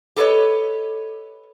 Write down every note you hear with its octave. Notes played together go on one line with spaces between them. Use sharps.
G4 A4 B4 C#5 D#5